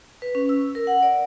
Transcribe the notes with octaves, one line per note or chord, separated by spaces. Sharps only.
B4
C#4
E6
A#4
F#5
D5